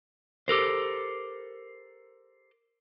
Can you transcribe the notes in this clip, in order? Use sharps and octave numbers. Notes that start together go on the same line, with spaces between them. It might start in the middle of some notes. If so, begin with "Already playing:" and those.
G4 A4 A#4 C5